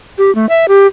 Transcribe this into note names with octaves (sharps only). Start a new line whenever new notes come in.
G4
A3
E5
G4